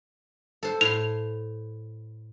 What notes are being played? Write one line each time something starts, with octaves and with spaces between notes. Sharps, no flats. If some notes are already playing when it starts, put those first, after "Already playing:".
A4 C5
A2 C6 F7